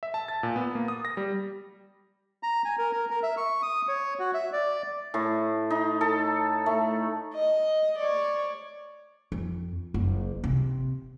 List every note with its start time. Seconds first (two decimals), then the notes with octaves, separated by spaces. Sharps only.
0.03 E5
0.14 A5
0.28 A6
0.43 A#2
0.56 B3
0.75 A#3
0.88 D#6
1.05 A#6
1.17 G3
2.43 A#5
2.65 G#5
2.78 A#4
2.93 A#4
3.10 A#4
3.23 E5
3.37 C#6
3.62 D#6
3.88 C#5
4.19 F#4
4.34 E5
4.53 D5
5.14 A2
5.70 D#4
6.01 A4
6.66 A3
7.34 D#5
7.99 C#5 D5
9.32 F2
9.94 F#1
10.44 C3